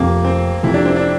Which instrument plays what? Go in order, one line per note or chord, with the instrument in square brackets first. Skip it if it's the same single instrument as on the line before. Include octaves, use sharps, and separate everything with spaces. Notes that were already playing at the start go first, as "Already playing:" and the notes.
Already playing: [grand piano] F1 F2 C3 [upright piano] A#3
[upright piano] C4
[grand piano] F1 F2 C3 [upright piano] E4
[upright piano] D4
C4
D4